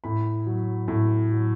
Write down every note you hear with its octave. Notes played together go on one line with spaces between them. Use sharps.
A2 B5
F#3
A2
F#3